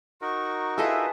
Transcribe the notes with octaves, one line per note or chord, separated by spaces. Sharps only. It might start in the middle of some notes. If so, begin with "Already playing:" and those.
D#4 F#4 A#4 C#6
E4 F4 G#4 A4 B4 D#5 E5